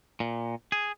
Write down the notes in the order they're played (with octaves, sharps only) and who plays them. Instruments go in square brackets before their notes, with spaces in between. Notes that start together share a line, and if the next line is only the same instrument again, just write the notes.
[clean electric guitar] A#2
G#4